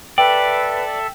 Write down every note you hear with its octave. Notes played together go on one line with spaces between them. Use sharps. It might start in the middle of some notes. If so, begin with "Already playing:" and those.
A4 B4 D5 E5 G5